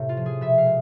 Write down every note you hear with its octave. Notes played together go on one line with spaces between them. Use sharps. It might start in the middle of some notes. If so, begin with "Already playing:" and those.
Already playing: A2 C3 A3
F4
F3
G#4
B2 E5
F5
G#3